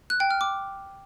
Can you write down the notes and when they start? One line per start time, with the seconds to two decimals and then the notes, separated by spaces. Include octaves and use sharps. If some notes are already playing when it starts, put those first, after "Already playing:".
0.10 F#6
0.20 G5
0.31 F6
0.41 D6